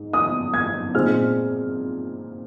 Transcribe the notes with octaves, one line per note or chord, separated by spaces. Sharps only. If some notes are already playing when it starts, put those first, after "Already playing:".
Already playing: G#2
D#6
G#6
A#2 G#3 C4 D#4 F6